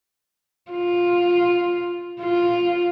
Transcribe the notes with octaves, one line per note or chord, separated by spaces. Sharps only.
F4
F4